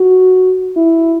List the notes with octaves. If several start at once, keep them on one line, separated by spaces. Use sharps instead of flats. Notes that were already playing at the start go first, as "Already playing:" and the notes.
Already playing: F#4
E4